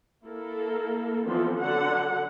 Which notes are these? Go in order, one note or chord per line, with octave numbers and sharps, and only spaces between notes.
A#3 E4 A4 A#4
E3 F3 B3 C4 D4 A4
D3 F#3 F#5